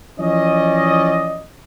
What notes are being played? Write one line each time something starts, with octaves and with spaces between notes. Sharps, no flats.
E3 F3 C#4 D5 D#5